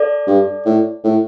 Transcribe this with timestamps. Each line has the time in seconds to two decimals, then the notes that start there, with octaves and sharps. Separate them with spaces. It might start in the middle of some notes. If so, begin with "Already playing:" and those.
Already playing: A4 D5
0.27 G2
0.65 A2
1.04 A2